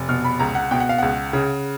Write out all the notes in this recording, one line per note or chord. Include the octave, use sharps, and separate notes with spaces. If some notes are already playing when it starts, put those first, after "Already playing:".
Already playing: F1
B2 F6
B5
C#2 A#5
F#5
B2 G5
F#5
F5
C#2 F#5
C#3